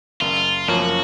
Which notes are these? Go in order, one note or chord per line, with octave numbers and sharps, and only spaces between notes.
F#1 F4
F#2 F3 A#3 C#4 F#4